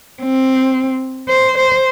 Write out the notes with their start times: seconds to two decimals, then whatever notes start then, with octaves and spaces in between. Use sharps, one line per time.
0.23 C4
1.29 C5
1.58 C5